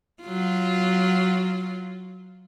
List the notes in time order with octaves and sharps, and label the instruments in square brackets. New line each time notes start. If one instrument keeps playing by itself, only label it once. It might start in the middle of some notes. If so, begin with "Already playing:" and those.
[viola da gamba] F#3 F4